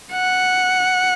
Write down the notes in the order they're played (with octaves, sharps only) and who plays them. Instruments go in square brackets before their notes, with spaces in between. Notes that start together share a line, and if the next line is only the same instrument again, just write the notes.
[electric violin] F#5